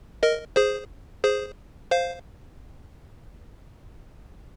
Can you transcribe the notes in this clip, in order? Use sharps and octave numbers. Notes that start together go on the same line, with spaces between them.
A#4 D#5
G#4 C5
G#4 C5
C5 F5